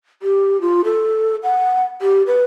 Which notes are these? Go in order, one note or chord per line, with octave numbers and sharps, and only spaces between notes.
G4
F4
A4
F#5
G4
B4